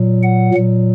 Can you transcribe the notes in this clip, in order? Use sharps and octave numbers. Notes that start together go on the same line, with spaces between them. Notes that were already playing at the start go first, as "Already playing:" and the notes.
Already playing: A#2 F#3
F#5
A#2 F#3